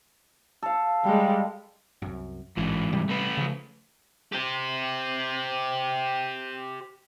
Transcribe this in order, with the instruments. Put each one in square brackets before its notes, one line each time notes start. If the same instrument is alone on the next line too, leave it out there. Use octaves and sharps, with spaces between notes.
[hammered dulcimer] A4 F5
[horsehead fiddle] G3 G#3
[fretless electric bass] C2 F#2
[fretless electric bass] A1 [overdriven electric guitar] G#2 E3
[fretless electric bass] C3 G3
[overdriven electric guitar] A3 B4
[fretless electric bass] C#3 F3
[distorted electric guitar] G4 C5